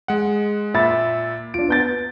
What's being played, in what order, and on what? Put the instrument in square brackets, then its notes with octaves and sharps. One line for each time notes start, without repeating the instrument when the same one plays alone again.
[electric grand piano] G#3 F#5
[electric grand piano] A#2 [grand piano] E5 B5 A6
[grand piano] D4 F4 [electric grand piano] D7
[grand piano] B3 G6 A6